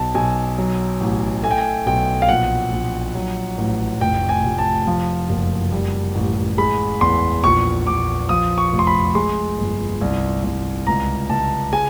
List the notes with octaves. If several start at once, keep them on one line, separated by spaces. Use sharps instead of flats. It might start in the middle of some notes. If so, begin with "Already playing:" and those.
Already playing: B1 A5
B1 G#5
F#3
A1
A3 G#5
G5
G#5
B1 G5
F5
A#1 F#5
A#1
F#3
A1
F1 G5
G#5
F1
A5
F3
F#1
G3
A1
G#3 B5
E2 C6
A#1 C#6
A#1 D6
F3 D#6
C#6
F1
C6
B5
G#3 C6
G1
C2
C2
C#2 A#5
C#2 A5
G#3 G#5